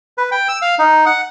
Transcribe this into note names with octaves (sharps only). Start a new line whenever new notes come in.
B4
G5
E6
F5
D#4
F#5